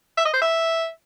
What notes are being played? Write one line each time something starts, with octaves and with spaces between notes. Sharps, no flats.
E5
D#5
C5
E5